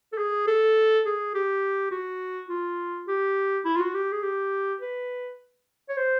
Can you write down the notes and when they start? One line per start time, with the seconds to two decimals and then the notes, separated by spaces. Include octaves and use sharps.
0.13 A4
0.18 G#4
0.48 A4
1.06 G#4
1.35 G4
1.91 F#4
2.49 F4
3.08 G4
3.65 E4
3.76 F4
3.79 F#4
3.94 G4
4.12 G#4
4.22 G4
4.80 B4
5.89 C#5
5.97 C5